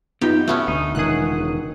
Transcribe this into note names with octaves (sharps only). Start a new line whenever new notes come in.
F#2 B3 D#4 F4 G4
B2 A3 B3 C#4
D2 D#4
E1 C#2 D#3 F#3 G#4 D#6 F#6